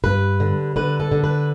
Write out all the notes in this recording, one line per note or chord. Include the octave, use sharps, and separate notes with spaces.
G2 B4
D3
D3 B4
A4
D3
B4